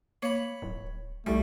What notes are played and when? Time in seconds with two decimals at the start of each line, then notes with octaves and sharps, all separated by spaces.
0.22 A#3 C#5 B5
0.62 D1
1.26 C2 G3 A3